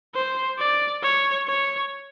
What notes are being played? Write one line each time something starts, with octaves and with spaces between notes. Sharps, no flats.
C5
D5
C#5
C#5